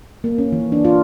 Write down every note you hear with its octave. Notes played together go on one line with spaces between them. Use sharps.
A#3
C#4
E3
D4
F4